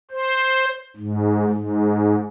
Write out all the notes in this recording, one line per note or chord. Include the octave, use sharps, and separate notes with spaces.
C5
G#2
G#2